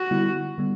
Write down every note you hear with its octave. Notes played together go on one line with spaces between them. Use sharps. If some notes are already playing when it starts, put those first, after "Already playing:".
Already playing: F#4
D3 G3 B3 E4
D3 G3 B3